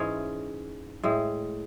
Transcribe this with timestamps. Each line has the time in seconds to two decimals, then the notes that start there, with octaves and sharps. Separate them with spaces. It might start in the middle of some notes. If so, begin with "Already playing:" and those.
Already playing: G#2 E3 G#3 C#4
1.03 A2 G#3